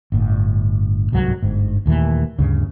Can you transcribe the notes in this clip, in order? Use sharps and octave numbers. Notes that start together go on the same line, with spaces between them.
G1 A2
D1 C2 G#2 F#3
G1 G#2
D#1 D#2 E3 A3
D2 G2 C#3